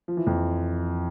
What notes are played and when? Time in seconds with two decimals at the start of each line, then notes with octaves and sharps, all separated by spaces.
0.08 F3
0.17 E3
0.27 F2